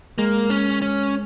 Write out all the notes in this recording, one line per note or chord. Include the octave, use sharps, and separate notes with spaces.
G#3 A#3
C#4
C#4